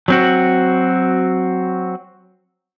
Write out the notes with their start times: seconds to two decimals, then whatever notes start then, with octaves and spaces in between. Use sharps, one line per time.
0.08 F#3 C4 F#4